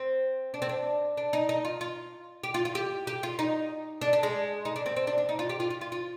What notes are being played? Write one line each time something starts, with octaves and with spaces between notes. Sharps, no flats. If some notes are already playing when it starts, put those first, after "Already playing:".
Already playing: C4
D4
C4
D4
D4
D#4
D#4
F4
F4
G4
F4
F4
G4
G4
F4
D#4
D4
D4
G#3
D#4
D4
C4
C4
D4
D4
D#4
F4
G4
F4
F4
F4
F4